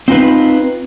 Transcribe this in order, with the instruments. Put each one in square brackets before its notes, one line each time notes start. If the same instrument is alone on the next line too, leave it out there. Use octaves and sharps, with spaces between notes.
[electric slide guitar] C4 D#4 F4 B4